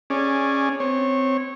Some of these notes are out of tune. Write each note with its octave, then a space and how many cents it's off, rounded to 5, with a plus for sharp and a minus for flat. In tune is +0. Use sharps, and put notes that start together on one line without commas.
C#4 -10 G#4 +0 D5 +0
C4 -15 C#5 -20